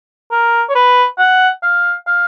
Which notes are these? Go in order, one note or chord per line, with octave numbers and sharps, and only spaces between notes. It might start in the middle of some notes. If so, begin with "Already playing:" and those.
A#4
C#5
B4
F#5
F5
F5